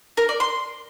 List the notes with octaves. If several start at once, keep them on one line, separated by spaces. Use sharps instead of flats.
A#4
D5
C6